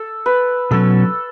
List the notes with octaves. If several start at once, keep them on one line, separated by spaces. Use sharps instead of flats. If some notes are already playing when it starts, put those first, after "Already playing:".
Already playing: A4
B4
B2 F#3 C#4 A4